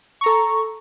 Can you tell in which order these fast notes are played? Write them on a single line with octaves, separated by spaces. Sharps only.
C#6 A#5 A4